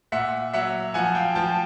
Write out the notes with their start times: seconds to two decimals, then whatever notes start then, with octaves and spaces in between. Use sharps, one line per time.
0.12 A#2 E5 F#5
0.53 F#3 E5 F#5
0.94 F3 F#5 G#5
1.15 F5 G5
1.35 F3 G5 A5